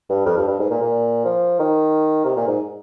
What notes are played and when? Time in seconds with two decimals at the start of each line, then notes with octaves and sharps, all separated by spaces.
0.10 G2
0.25 F2
0.37 G2
0.47 G2
0.59 G#2
0.70 A#2
0.81 A#2
1.25 F3
1.59 D#3
2.25 C3
2.36 A#2
2.47 G#2